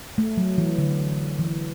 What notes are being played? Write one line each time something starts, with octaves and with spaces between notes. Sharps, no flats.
A3
F#3
E3
D3
E3